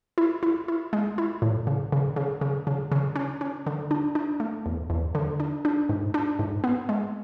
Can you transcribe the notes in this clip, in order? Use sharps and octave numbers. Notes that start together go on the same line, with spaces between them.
E4
E4
E4
G#3
E4
A2
C#3
C#3
C#3
C#3
C#3
C#3
C#4
C#4
D3
D4
D4
A3
E2
E2
D3
D4
D4
G#2
D4
G#2
B3
G#3